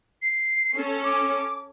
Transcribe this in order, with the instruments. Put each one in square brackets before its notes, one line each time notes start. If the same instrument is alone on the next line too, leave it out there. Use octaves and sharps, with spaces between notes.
[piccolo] C7
[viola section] C#4 A4
[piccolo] D6